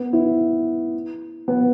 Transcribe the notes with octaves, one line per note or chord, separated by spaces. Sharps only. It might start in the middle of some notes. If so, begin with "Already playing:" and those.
Already playing: B3
E4
B3